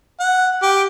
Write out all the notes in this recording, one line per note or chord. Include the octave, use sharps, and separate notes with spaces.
F#5
G4